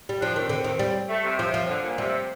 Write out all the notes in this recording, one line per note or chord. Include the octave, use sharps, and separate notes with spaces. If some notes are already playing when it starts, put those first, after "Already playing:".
G3
F3 D4
D4
D#3 C4
D3
D#3
G3
A3
C3
C3 F3
F3
D3
A#2
C3 G3